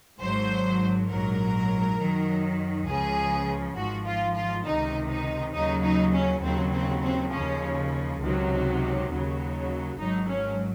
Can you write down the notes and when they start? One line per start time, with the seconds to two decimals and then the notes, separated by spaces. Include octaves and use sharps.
0.19 G#1 G#2 F#3 C5
1.09 A#1 G#2 F#3 A#4
1.98 F#2 D#3 F#3
2.86 C#2 C#3 F3 G#4
3.76 G#1 G#2 F3 F#4
4.06 F4
4.35 F4
4.65 C#2 C3 D#3 D#4
5.09 D#4
5.54 D#2 C#3 F#3 D#4
5.83 D#4
6.13 C#4
6.43 D#2 C#3 F#3 C4
6.72 C4
7.02 C4
7.32 D#2 C#3 F3 C#4
8.21 C#2 C3 D#3 F#3
9.10 D#2 C#3 F#3
9.99 G#1 G#2 F#3 D#4
10.29 C#4